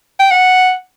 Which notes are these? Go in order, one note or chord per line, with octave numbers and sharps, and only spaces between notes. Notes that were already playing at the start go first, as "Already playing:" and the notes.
G5
F#5